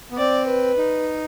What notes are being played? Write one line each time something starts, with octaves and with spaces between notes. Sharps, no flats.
B3
C4 D5
B4
D#4